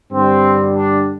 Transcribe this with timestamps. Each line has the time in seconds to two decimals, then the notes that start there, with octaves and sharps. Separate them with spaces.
0.12 G2 D3 G3 C4
0.74 D4